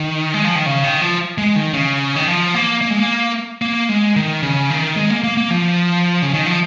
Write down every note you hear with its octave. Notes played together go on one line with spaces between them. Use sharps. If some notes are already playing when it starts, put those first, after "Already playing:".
Already playing: D#3
G#3
F3
D#3
C#3
D#3
F3
G#3
D#3
C#3
D#3
F3
A#3
A#3
G#3
A#3
A#3
G#3
D#3
C#3
D#3
G#3
A#3
A#3
A#3
F3
C#3
D#3
F3